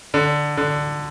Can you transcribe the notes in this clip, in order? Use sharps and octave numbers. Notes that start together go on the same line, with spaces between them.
D3
D3